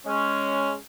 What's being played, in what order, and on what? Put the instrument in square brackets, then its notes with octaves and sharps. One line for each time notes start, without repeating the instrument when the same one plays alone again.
[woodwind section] G#3 C#4